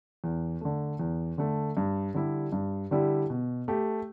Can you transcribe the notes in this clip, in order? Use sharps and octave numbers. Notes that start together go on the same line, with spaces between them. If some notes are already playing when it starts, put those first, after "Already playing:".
E2
D3 A3
E2
D3 A3
G2
D3 G3 E4 G4
G2
D3 G3 E4 G4
B2
A3 G4